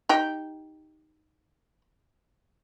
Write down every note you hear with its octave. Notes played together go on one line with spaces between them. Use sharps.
D#4 G4